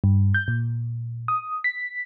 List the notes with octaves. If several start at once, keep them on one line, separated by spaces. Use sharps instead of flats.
G2
G6
A#2
D#6
B6